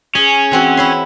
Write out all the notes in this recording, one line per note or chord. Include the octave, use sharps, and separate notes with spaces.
C#4 G#4
E3 C4 F#4
E4 C#5 C6